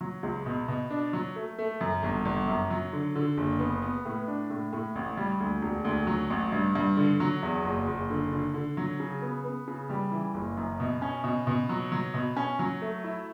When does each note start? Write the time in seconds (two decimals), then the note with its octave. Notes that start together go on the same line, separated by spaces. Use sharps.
0.01 F#3
0.23 C#2
0.46 B2
0.68 B2
0.91 D4
1.13 F#3
1.36 A3
1.58 A3
1.81 F#2
2.03 G1
2.25 G1
2.48 F#2
2.70 F#3
2.93 D3
3.15 D3
3.37 F#1
3.60 B3
3.82 B3
4.05 A2
4.28 D4
4.50 A2
4.73 A2
4.95 A1
5.17 G3
5.40 D2
5.62 E1
5.85 D2
6.07 F#3
6.30 A1
6.52 G2
6.75 G2
6.97 D3
7.20 F#3
7.43 E2
7.65 F#1
7.87 F#1
8.10 D3
8.32 D3
8.54 D3
8.77 F#3
9.00 C#3
9.22 B3
9.45 B3
9.68 C#3
9.90 G3
10.12 E3
10.34 F#1
10.57 F#2
10.80 B2
11.02 C#4
11.24 B2
11.47 B2
11.69 F#3
11.92 F#3
12.14 B2
12.37 C#4
12.59 F#3
12.82 A3
13.04 E4